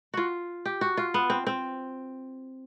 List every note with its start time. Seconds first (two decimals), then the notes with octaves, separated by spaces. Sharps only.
0.14 F4 F#4
0.65 G4
0.81 F#4
0.97 F4
1.14 B3
1.30 C4
1.47 C4